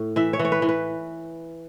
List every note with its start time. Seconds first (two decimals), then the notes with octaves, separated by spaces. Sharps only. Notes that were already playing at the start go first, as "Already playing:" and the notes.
Already playing: A2
0.16 E3 E5
0.33 C#5
0.39 E3
0.45 C#5
0.52 B4
0.62 E3
0.69 B4